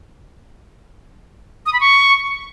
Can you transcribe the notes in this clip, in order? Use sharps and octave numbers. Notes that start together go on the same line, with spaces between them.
D#6
B5
C#6